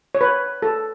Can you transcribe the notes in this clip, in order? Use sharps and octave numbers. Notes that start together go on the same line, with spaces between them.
C#5
B4
A4